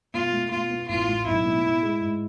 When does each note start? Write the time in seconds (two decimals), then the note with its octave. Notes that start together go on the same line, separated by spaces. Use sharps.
0.14 B2 F4
0.32 A3
0.51 B2 F4
0.70 B3
0.88 A1 F4
1.07 A2
1.26 B1 E4
1.45 B2
1.64 A2
1.83 G#3
2.01 G#2